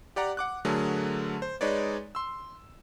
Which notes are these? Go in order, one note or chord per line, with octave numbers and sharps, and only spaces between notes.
G4 D5 F#5 A#5
F#5 D6 F#6
D3 F#3 A3 G#4 A#4
C5
G#3 D#4 B4 C#5 D5
C6 E6